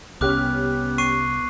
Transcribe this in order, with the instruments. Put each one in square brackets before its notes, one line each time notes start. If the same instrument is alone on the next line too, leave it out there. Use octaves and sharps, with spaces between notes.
[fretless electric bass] C2 [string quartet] B3 [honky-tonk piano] C#4 G4 F6 [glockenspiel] D6 F#6
[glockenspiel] C#6 C7 D#7